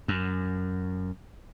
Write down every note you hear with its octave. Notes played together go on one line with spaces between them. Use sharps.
F#2